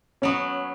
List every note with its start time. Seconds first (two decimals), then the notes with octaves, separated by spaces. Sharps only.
0.22 F#3 B3 C#4